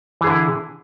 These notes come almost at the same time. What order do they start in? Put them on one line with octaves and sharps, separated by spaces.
E3 G#4 D3 E4